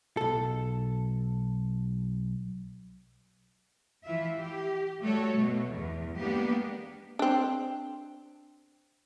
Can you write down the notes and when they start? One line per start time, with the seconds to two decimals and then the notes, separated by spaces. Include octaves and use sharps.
0.17 B1 A4
4.05 E3 E4 F4 E5
4.37 G4
5.02 G3 A3 F#4 A4 C#5
5.37 B2 A3
5.71 E2
6.17 G#3 A#3 B3 D4 G4
7.19 C4 D4